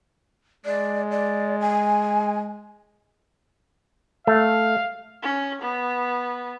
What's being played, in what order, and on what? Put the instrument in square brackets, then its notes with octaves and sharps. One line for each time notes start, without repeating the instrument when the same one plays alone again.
[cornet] G#3 [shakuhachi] D5
[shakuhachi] D5
G#5
[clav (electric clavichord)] A3 [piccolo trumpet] F5
[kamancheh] C#4
B3